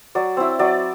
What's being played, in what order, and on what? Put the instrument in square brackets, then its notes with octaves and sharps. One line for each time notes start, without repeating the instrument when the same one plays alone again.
[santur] F#3 D5
C4 E4
F#3 D5